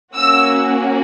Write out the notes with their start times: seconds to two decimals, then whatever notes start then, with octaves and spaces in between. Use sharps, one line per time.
0.15 A#3 C#4 F#4 E6